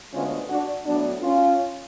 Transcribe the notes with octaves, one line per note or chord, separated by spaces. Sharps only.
D2 D3 G#3 B3 C#4 F4
D4 F#4
A2 F#3 B3 D4
C#4 F4